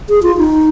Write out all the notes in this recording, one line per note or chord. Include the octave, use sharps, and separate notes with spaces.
G#4
F4
D#4